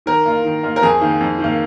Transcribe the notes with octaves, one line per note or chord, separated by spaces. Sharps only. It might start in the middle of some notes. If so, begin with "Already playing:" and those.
D#3 A#4
A#3 F4
D#3
A#3 F4
A#4
F2 G#4
D#3 A#3
F2
D#3
A#3